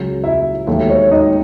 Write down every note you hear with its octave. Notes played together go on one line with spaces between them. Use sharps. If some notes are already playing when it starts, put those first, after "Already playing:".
Already playing: C#2 C#3 F#3
E4 E5
E1 D#2 D#3 F#3 A3
C#5
D#4 D#5